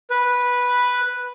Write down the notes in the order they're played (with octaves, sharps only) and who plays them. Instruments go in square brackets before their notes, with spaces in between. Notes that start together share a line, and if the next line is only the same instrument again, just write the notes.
[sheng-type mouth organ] B4